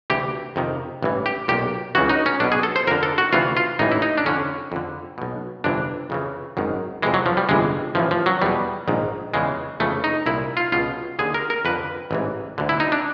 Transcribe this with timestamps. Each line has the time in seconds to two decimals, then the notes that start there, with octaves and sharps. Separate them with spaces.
0.10 D2 C3 E3 G4
0.56 F2 C3 D#3
1.03 A1 G2 E3
1.26 G4
1.48 B1 A#2 G4
1.95 C#2 C#3 E3 F#4
2.09 D#4
2.26 C#4
2.40 B1 B2 D4
2.52 G#4
2.63 A4
2.76 C5
2.87 F2 D3 A#4
3.03 A4
3.18 F#4
3.33 D2 C3 E3 F4
3.57 F4
3.79 A1 A2 E3 D#4
3.92 E4
4.02 D#4
4.18 D4
4.25 F2 D3 C#4
4.72 F2 D3
5.18 B1 B2
5.64 G1 F2 C3 E3 D4
6.10 F2 C#3 E3
6.57 G#1 F#2 D#3
7.02 F2 C3 E3 G#3
7.14 F#3
7.26 F3
7.37 G3
7.49 G1 F2 C3 E3 G#3
7.95 A1 A2 E3 F3
8.11 F3
8.26 F#3
8.42 E2 B2 G3
8.88 A#1 G#2 D#3
9.34 E2 C#3 E3 G#3
9.80 F2 C#3 E3 A3
10.04 D#4
10.26 C2 A#2 E4
10.57 F4
10.72 C#2 B2 F4
11.19 D#2 D3 G#4
11.34 A#4
11.50 A#4
11.65 F2 D3 B4
12.11 A1 G#2 E3
12.58 D2 D3
12.69 E4
12.80 D#4
12.92 D4